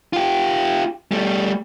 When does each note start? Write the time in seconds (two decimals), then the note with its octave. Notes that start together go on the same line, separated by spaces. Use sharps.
0.13 F4 G4
1.11 G3 A3